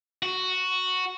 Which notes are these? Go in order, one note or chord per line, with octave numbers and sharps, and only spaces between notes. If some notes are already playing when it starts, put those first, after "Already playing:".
F#4